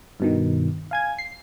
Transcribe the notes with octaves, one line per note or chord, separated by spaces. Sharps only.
G2 B2 D#3
F5 G#5 G#6
C7